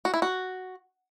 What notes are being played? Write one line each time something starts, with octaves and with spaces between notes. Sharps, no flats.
F#4
E4
F#4